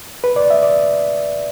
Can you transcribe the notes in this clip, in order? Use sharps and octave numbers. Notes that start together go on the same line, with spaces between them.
B4
D5
E5
D5